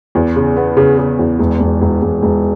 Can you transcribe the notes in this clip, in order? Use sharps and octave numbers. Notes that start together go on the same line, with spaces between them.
E2
C#3
B3
C#3
C#3
E2
E1
E1
E1
E1
E1